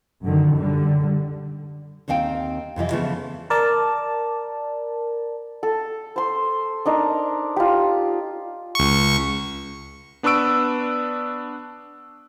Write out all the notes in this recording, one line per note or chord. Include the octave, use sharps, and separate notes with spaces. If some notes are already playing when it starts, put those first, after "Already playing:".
F#2 D3 D#3
D3 G3
D#2 D#3 C4 F5 G5
F2 C3 E3 D#5
C#3 E3 F3 A3 B3
A#4 D5 A5
A4
C5 C6
D4 D#4 A#4
F4 G4
C#2 C#6
B3 D4 B4 C#6 E6 D7